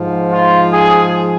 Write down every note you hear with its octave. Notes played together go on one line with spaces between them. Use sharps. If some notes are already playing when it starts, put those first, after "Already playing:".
Already playing: G#2 F3
F4
G#4